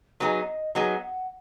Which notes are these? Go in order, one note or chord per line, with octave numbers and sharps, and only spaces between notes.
F#3 B3 D#4 G#4 D#5
F#3 B3 D#4 G#4 F#5
F#5